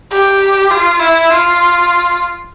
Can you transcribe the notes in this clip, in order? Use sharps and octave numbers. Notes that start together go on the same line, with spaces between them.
G4
F4
E4
F4